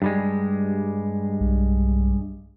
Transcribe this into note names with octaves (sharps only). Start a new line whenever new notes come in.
G2 G3 G#3
B1